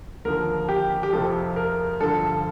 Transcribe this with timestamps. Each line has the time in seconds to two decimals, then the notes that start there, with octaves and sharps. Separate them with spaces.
0.25 D#2 D3 F3 A#4
0.69 G4
1.03 G4
1.13 F2 C3 F3 A4
1.56 A#4
2.00 G2 D3 F3 A4